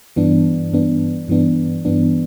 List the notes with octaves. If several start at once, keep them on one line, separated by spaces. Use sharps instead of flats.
G2 E3 B3 D4
G2 E3 B3 D4
G2 E3 B3 D4
G2 E3 B3 D4